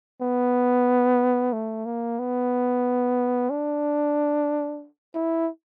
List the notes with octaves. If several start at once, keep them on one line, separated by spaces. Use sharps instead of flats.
B3
A3
A#3
B3
D4
E4